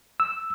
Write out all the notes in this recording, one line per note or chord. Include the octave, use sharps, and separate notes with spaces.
E6